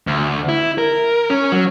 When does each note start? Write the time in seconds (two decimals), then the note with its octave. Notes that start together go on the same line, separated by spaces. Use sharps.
0.07 D2
0.49 E4
0.78 A#4
1.30 C#4
1.52 F#3